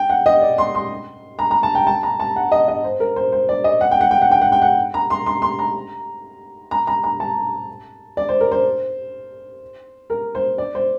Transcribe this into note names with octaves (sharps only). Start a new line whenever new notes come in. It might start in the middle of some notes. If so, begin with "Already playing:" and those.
Already playing: G5
F#5
D#5
D5
C6
C6
A#5
A#5
A5
G5
A5
A#5
A5
F#5
D#5
D#5
C5
A#4
C5
C5
D5
D#5
F#5
G5
F#5
G5
F#5
G5
F#5
G5
F#5
A#5
C6
C6
C6
A#5
A#5
A#5
A#5
A5
D5
C5
A#4
C5
A#4
C5
D5
C5